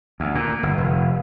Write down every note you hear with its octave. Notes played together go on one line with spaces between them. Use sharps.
D2
A#2
G1
F1